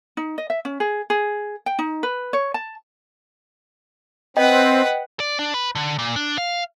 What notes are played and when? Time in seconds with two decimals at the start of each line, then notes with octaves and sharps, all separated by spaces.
0.17 D#4
0.38 D#5
0.50 E5
0.65 C#4
0.80 G#4
1.10 G#4
1.66 G5
1.79 D#4
2.03 B4
2.33 C#5
2.54 A5
4.37 C4 B4 D#5 F#5 G5
5.20 D5
5.39 D4
5.54 B4
5.75 D3
5.99 A#2
6.16 D4
6.38 F5